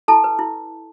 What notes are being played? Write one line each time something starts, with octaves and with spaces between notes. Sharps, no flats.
E4 A4 A5
B4
E4